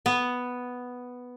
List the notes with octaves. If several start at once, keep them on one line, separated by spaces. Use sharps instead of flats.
B3